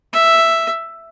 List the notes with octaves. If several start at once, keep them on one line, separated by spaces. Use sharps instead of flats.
E5